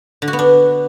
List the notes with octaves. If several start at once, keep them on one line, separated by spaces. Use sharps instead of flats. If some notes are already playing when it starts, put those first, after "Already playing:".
D3
F#4
B3
D4